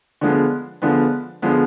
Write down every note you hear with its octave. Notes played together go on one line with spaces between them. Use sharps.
D3 F3 G#3 B3
D3 F3 G#3 B3
D3 F3 G#3 B3